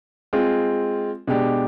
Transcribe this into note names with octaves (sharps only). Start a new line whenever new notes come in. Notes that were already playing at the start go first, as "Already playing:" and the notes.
G#3 C4 F4 G#4
B2 G#3 D4 G4